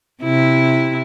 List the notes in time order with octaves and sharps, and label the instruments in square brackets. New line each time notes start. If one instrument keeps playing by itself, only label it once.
[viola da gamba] C3 E4